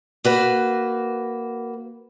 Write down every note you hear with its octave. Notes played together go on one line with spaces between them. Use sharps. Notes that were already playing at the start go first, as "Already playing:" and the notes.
A#3 F#4 B4